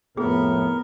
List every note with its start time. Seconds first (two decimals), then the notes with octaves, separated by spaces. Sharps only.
0.17 F2 A2 B3 G#4 A#4